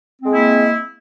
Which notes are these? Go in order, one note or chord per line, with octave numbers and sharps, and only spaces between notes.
G#3 A#3 C4 E4